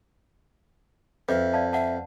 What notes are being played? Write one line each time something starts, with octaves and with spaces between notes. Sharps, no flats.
F2 B4 E5
D5 F5 A5
E5 F#5 A5